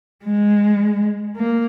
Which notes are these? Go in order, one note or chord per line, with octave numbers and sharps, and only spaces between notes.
G#3
A#3